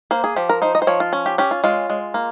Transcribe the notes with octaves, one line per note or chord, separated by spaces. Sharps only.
A#3 C5
G#4
F3 G4
A#4
D#4 C5
D#5
C5
F3 C#5
F4
C#4
G4
C#4 G4
F4
G#3 F4
G#3
A#3